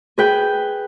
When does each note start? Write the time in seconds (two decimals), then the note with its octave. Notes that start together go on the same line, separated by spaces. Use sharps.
0.18 G#4 B4 G5